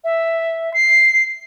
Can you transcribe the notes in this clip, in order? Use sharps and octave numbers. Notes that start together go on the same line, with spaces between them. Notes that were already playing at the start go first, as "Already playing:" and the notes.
E5
C7